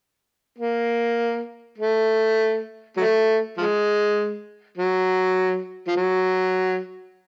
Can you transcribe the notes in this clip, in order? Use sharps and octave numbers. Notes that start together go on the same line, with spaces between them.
A#3
A3
F#3 A3
F3 G#3
F#3
F3
F#3